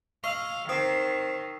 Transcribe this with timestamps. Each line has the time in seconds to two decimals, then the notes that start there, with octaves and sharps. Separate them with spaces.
0.24 D#5 F5 C#6 E6 F#7
0.69 D#3 C4 D#6 C7